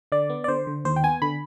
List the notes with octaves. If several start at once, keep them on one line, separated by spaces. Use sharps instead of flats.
D3 D5
B3
D5
D3 C5
D3
D#2 C5
G5
B3 G#5
D3 B5